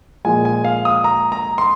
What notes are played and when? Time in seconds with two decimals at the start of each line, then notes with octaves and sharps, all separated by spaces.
0.25 A#2 F3 G#3 G#5
0.45 G#5
0.65 F5
0.85 D#6
1.04 A#5
1.32 A#5
1.58 C6